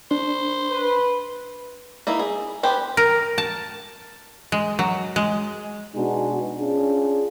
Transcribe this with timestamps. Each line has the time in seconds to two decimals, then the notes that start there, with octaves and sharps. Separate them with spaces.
0.11 D4 C5
0.71 B4
2.07 A#3 D#4 E4
2.19 G#4
2.63 B3 G4 C5
2.97 A#4
3.38 A5
4.52 G#3
4.79 F#3
5.16 G#3
5.95 B2 G#3 B3 D4 D#4 F#4
6.60 C#4 D4 F4 G#4